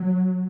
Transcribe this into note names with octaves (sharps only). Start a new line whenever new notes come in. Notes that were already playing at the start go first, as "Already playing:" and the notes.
Already playing: F#3